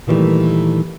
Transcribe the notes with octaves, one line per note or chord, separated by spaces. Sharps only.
A#2 D#3 E3 F#3 G3 A3